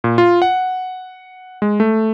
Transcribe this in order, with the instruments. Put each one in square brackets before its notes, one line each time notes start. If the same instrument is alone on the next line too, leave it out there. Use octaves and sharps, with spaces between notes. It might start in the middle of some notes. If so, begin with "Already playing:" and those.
[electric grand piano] A#2
F4
F#5
G#3
A3